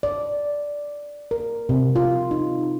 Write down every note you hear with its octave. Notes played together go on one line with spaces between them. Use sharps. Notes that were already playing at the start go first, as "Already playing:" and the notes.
D5
A#4
C3
F4
D#4